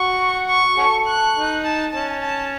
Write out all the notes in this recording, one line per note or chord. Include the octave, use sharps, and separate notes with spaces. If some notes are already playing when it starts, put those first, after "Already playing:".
Already playing: F#4 C#6
C#6
C#4 F#4 A4
F#6
D#4
A5
C#4 A5
A5